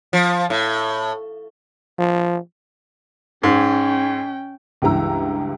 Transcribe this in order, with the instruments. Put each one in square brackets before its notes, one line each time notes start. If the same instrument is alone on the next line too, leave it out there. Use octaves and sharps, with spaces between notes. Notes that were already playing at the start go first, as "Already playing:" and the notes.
[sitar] F3
A2
[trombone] F3
[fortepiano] G#2 [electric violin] C#4 G5
[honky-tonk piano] C#2 G2 E3 A#5 E6